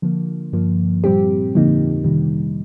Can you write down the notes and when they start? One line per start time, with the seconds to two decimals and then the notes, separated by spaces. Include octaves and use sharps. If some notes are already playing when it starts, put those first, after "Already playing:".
0.02 D3 F3 A#3
0.53 G2 F3 A#3
1.04 A#2 G3 C4 G4
1.54 F2 D3 F3 A#3 D#4
2.04 C3 D#3 G3